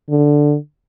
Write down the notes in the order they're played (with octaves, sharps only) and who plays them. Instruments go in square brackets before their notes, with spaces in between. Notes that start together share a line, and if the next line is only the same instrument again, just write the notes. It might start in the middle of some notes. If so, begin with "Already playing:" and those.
[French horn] D3